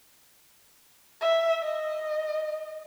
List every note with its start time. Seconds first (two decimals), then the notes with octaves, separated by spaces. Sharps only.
1.21 E5
1.63 D#5